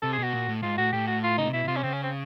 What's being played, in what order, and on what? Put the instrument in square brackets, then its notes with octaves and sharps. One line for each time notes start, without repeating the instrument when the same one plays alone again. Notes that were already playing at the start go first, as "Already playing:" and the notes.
[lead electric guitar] C3 [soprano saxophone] A4
[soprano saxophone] G#4
[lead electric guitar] B2 [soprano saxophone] F#4
[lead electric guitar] A#2
A2
[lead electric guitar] G#2 [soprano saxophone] F4
[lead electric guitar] A2 [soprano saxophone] F#4
[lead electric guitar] A2 [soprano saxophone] G4
[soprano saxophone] F#4
F4
[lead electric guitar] C#3 [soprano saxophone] D#4
[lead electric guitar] C3
[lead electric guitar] B2 [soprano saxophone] E4
[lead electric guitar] B2
[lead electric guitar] C3 [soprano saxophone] F4
[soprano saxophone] C#4
[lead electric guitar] C#3 [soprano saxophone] C4
[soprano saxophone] C#4
C4